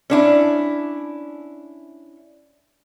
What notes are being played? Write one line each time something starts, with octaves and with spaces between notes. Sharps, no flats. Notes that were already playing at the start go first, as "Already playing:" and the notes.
C#4 D4 E4